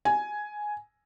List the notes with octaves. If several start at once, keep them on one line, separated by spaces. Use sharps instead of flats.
G#5